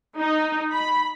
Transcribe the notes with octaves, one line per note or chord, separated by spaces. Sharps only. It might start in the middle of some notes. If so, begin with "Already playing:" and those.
D#4
B5